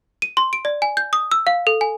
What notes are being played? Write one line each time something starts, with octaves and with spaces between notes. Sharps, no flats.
D#7
C6
D7
D5
G#5
G6
D#6
E6
F5
A4
G#5